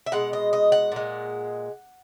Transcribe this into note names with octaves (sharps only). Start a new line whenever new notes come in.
E5
B2 G#3 F#5
D#5
D#5
F#5
A#2 G#3